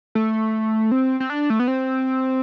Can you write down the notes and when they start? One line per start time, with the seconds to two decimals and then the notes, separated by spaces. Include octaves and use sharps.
0.15 A3
0.92 C4
1.20 C4
1.30 D4
1.50 A3
1.60 B3
1.68 C4